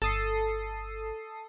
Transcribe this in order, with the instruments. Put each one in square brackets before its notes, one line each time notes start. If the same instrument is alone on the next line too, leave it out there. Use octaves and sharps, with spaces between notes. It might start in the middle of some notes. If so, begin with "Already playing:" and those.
[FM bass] G1 [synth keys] A4 D#6 C7